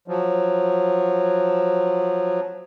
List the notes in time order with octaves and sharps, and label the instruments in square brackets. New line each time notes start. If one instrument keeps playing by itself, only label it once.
[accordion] F3 F#3